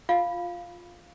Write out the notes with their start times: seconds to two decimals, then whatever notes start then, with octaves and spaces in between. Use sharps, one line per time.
0.09 F4 F5